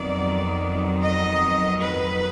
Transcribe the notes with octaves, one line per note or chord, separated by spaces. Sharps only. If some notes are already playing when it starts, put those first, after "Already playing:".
Already playing: F2 D#3 F#3 B3 D5
D#5
B4